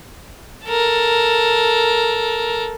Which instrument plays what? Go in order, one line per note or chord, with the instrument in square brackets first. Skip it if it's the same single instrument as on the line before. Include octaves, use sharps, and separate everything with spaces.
[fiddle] A4 A#4